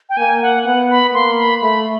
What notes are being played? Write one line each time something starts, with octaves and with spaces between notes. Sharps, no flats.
G5
A#3 G#5
F#5
B3 F#5
B5
A#3 C6
B5
A3 B5